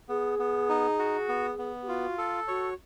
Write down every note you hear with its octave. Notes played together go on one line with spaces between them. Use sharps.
B3 G#4
B3
D#4
F#4
B3
B3
G4
F4 F#4
A4
F#4 C#5